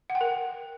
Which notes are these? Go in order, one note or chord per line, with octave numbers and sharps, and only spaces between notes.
F#5
G5
A#4